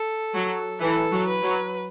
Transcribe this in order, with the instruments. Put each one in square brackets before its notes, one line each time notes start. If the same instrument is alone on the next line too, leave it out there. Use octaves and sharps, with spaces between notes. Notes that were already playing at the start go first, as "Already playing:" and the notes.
Already playing: [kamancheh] A4
[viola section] F#3
[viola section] E3 [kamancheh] A4
[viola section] F#3
[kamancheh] B4
[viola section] F#3